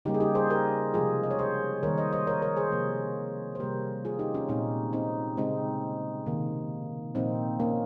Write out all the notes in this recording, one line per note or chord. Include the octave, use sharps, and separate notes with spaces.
C#3 G3 A#3 D#4 G4
G#4
D#4 G4
G#4 C5
G4 A#4
C3 F3 G#3 F4 G#4
D#5
C#5
G#4 C5
D#3 G3 A#3 A#4 C#5
C5 D#5
C5 D#5
A#4 C#5
A#4 C#5
G#4 C5
C3 F3 A#3
C5
C3 G3 A#3 G4 A#4
F4 G#4
D#4 G4
C#4 F4
A#2 G#3 C4 D#4
C4 D#4
C#3 G#3 C4 D#4
C3 D#3 A#3
A#2 F3 A#3 C4 D#4
A#3 C#4